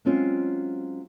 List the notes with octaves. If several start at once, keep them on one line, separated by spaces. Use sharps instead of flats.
F#3 G#3 C4 C#4 F4